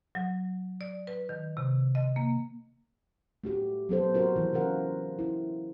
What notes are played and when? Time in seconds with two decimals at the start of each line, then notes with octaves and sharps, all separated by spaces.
0.15 F#3
0.81 D5
1.07 B4
1.29 D#3
1.57 C3
1.95 D#5
2.16 A#3
3.44 A3 F#4 G4
3.89 F#3 B3 A4 C5
4.14 F#4 A#4 C5
4.36 E3
4.53 C#3 E3 F4 A#4 F#5
5.19 E4